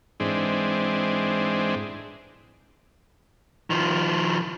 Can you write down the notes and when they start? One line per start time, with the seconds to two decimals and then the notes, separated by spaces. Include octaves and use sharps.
0.20 G#2 E3 G#3 C4 D4
3.70 D#3 F3